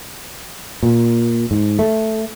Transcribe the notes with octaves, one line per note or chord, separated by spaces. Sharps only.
A#2
G#2
A3